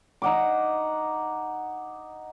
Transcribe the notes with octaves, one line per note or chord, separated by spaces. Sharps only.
D#4 F#5 D6